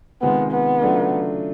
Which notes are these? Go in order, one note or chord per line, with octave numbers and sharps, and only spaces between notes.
C3 D#3 G#3 B3 C4 F4
B3
C#3 F#3 A3 D4 F4